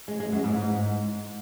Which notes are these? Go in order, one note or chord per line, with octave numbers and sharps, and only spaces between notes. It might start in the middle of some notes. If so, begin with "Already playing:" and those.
G#3
G#3
F#2
G#2
G#2